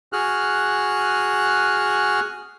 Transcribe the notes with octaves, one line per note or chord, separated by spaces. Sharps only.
F#4 G#4 F6 F#6